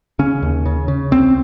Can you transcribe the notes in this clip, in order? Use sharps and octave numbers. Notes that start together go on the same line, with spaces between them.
C#3 C#4
D#2
C#3
C#3
C2 C4